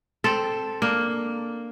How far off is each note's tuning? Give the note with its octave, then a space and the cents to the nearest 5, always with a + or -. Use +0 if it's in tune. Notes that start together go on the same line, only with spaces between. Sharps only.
C4 +0 A4 +0
A#3 +0 D4 +5